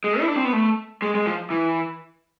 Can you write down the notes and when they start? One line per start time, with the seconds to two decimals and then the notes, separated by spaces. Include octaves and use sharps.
0.04 G#3
0.20 E4
0.28 D4
0.36 C4
0.45 B3
0.53 A3
1.02 G#3
1.15 G#3
1.26 F3
1.50 E3